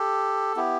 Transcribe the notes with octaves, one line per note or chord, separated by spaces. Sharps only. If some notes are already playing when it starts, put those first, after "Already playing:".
Already playing: G4 A4
B3 E4 G4